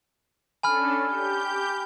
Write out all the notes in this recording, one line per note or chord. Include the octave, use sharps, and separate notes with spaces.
C#4 D4 A4 G#5 B5 F6
G4 G6